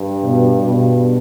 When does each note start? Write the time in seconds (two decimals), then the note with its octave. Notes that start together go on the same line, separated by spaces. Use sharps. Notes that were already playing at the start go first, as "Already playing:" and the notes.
Already playing: G2
0.23 B2
0.64 G2 B2